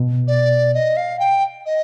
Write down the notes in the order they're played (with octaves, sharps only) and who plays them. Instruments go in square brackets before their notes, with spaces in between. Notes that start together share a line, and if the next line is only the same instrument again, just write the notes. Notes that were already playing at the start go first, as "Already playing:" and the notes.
Already playing: [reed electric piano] B2
[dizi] D5
D#5
F5
G5
D#5